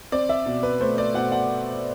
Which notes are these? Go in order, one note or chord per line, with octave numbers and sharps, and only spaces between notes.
C4 D5
E5
B2
B4
A3 C5
D5
B2 F#5
F#5